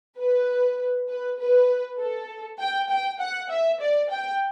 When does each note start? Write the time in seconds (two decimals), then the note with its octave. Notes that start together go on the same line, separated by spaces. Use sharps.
0.17 B4
1.08 B4
1.39 B4
1.99 A4
2.59 G5
2.89 G5
3.20 F#5
3.50 E5
3.80 D5
4.10 G5